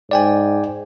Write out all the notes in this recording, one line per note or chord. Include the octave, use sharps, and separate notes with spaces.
G#2 D5 G5 G#5